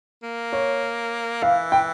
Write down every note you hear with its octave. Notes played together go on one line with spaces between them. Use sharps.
A#3
C#5
E3 F5
G5